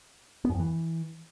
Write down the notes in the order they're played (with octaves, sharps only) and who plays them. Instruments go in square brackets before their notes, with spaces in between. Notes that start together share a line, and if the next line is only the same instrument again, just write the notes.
[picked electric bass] B3
F#2
F2
E3